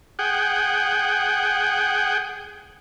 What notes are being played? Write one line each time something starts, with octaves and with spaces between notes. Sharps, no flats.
G#4 F#5 G5